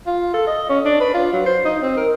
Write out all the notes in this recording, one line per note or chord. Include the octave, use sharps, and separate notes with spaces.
F4
A4
D#5
C#4
D4
B4
F4
F#3
C5
D#4
C4
A#4